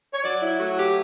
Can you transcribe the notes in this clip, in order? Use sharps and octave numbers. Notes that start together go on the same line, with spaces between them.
C#5
F#3 D5
E4
A3 F#4
G4